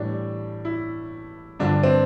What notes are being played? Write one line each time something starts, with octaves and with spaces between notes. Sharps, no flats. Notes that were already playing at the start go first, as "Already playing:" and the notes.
Already playing: A2 E3 G3 D4
E4
G2 D3 F3 D4
C4